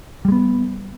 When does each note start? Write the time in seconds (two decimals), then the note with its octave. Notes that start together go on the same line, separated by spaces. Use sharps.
0.25 G3
0.28 G#3
0.32 B3